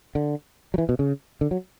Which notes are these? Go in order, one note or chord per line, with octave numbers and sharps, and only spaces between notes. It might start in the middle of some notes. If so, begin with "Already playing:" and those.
D3
F#3
E3
B2
C#3
D3
F#3